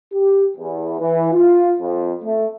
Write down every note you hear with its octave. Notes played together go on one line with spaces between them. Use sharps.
G4
E2
E3
F4
F2
A3